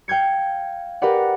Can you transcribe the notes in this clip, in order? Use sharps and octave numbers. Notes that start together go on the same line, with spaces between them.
F5 G5 G6 G#6 C#7
G4 A#4 B4 D5 F#5